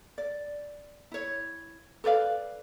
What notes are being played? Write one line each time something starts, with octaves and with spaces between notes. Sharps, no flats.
D5
E4 C#5
A4 B4 D5 F5